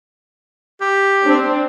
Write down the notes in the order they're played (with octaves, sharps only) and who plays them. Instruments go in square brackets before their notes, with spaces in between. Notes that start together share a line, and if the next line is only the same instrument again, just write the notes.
[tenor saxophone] G4
[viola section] C4 D4